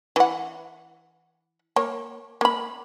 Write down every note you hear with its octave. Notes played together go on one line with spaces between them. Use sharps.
E3 F#5
A#3 C#5
A#3 B5